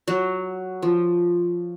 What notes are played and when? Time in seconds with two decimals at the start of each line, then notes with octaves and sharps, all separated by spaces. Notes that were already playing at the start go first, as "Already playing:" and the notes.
0.08 F#3
0.82 F3